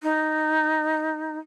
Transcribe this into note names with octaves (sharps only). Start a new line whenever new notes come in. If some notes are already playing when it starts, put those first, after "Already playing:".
D#4